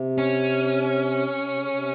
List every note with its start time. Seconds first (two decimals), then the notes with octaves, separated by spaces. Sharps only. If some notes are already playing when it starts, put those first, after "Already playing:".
Already playing: C3
0.18 C#4
1.46 C3
1.57 C#3
1.69 C3